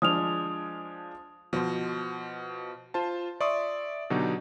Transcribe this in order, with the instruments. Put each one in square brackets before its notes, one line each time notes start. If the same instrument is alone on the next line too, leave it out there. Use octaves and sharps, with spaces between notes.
[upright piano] F3 G#3 D4 [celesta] D#6 F6 F7
[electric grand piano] B2 C5 [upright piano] F3
[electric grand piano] F4 C5 A5
D5 E5 C6 C#6 D#6
B2 D3 F#3 D#4 G4